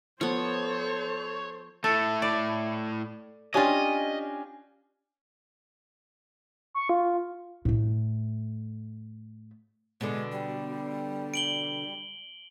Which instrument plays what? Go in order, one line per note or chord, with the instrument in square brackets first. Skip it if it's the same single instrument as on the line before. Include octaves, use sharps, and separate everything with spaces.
[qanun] F3 B3 [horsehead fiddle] A4 C5 [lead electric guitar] C#5
[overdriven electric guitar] A2 A3 [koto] A4
[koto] D5
[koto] C#4 F4 [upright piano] D4 G4 G#5 [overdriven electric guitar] D#5
[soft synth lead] C#6
F4
[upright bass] A2 A3
[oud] B2 D3 [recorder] G#3
[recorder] G3
[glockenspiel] D7 F#7 G7